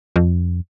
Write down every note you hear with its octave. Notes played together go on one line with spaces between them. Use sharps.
F2